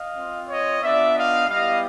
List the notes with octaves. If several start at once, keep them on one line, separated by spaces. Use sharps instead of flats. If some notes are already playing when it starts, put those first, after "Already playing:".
Already playing: D#5 F5
C4 F4
C#5 D#5
B3 D4 F4 D5 E5
D#5 F5
G3 B3 E4 G4 D#5 F5